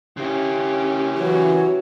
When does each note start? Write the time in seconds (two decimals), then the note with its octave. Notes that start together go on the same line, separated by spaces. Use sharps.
0.17 C#3 C#4 E4 G4
1.18 E3 F#3